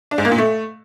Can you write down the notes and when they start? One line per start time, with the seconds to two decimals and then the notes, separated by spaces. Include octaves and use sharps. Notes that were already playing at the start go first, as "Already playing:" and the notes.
0.11 D4
0.18 G#2
0.25 A#3
0.32 A#2
0.38 A3